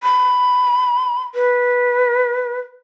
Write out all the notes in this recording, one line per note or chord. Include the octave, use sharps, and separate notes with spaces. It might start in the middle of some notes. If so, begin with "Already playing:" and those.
B5
B4